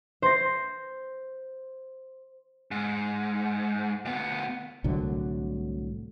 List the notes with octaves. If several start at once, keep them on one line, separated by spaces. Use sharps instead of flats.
C5 A#6
G#2
D2 B3
C2 A2 D3 F#3